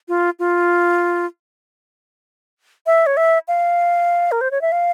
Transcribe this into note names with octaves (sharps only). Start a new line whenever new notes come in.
F4
F4
E5
C#5
E5
F5
A#4
C5
C#5
E5
F5